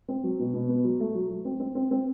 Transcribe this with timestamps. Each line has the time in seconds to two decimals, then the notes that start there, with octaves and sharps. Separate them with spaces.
0.08 C4
0.24 F#3
0.39 B2
0.54 B2
0.69 B3
0.84 F#3
1.00 A3
1.14 F#3
1.29 F#3
1.45 C4
1.60 C4
1.75 C4
1.91 C4